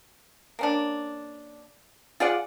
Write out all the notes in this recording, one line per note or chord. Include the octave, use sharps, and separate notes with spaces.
A#3 C#4 D4
F4 G#4 D5 F#5